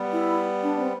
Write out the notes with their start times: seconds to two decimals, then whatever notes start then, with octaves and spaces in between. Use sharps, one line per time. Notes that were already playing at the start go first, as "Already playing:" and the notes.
Already playing: G3 B3
0.12 E4
0.62 D4
0.79 C4